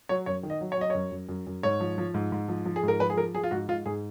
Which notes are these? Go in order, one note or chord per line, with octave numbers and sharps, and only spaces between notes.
F#3 C#5
F#2 C#5
D#3
D#5
F#3
C#5
F#3 D#5
F#2 C#5
F#2
F#2
F#2
G#2 C#5
F3
F3
G#2
G#2
F3
F3
G#4
G#2 A#4
F3 B4
G#4
F3 A#4
F3 G#4
F4
G#2 F#4
G#2 F4
G#2 G#4